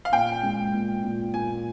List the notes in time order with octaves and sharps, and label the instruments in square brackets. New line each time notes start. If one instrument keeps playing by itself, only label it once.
[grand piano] F5
[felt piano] A#2 [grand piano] G5
[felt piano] G#3
A#2
A#2
[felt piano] A#2 [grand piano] G#5